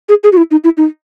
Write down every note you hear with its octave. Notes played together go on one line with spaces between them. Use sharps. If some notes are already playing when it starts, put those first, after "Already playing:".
G#4
G#4
F#4
E4
D#4
E4
D#4